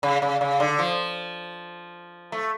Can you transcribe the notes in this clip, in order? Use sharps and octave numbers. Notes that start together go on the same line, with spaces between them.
C#3
C#3
C#3
D3
F3
A3